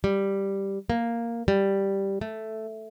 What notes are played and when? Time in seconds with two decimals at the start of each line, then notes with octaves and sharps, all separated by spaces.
0.04 G3
0.90 A#3
1.48 G3
2.21 A3